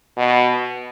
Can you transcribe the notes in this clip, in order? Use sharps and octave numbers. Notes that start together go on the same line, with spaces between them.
B2